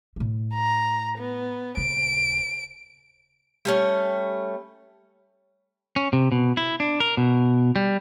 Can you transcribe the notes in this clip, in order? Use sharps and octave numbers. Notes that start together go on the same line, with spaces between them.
A2 A3
A#5
B3
D#1 C#3 D7
G3 A3 C#4
C#4
C3
B2
E4
D4
A#4
B2
G3